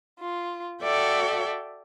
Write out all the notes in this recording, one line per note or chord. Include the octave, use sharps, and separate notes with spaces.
F4
F#4 A4 D5 E5 G5